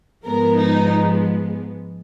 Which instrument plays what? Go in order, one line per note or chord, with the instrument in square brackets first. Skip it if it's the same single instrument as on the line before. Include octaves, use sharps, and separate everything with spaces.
[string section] G#2 F3 G#3 B3 A#4
D#4